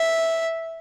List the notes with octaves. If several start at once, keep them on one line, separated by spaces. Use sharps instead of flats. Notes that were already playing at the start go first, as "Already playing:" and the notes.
Already playing: E5